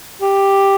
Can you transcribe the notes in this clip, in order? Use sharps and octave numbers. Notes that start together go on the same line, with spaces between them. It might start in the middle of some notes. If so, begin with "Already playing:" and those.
G4